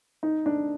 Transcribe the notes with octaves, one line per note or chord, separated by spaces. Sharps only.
D#4
D4